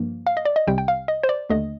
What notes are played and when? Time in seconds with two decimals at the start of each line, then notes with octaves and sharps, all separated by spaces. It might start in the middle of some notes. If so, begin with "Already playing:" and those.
Already playing: G2 F3 A#3
0.27 F5
0.37 D#5
0.45 D5
0.56 D#5
0.67 C2 C3 G3 G5
0.78 G5
0.88 F5
1.08 D#5
1.23 C5
1.29 D5
1.49 D#2 D3 A3 D#5